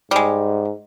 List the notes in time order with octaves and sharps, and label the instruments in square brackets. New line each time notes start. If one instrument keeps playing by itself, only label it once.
[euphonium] G#2 [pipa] G3 G#3